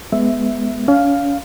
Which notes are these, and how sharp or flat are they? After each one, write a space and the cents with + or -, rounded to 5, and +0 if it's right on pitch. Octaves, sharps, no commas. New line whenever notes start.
G#3 +15 B3 +5 E5 +0
C#4 +35 F5 +0